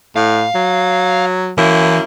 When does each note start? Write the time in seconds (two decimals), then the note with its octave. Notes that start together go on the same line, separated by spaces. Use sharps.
0.16 A2 F5
0.55 F#3
1.58 F#2 E3 A#3 E4